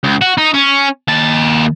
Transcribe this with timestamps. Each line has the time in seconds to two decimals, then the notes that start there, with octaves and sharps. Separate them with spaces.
0.04 C#2
0.21 F#4
0.38 D#4
0.54 C#4
1.08 D#2 A5